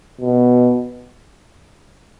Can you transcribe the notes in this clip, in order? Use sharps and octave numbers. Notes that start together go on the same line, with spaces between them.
B2